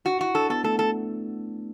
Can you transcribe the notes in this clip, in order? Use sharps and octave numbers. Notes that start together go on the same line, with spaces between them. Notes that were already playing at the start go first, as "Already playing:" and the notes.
D4 F#4
E4 F#4
D4 A4
B3 A4
A3 A4
A4